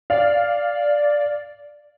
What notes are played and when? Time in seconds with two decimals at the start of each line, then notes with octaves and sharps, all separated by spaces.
0.10 D5 F5